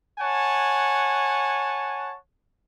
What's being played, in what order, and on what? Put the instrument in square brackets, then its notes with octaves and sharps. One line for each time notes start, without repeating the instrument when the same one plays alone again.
[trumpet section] C#5 F#5 G#5 A5